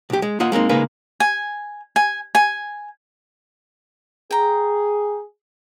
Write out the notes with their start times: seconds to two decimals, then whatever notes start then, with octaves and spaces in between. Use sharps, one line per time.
0.10 B1 G4
0.22 G#3
0.40 A#3 F4 D#5 F#5
0.52 G#3 A#3 C4 D#4
0.69 C#3 G#3 A#3 D#4 G#4 B4
1.20 G#5
1.96 G#5
2.35 G#5
4.31 G#4 G5 A#5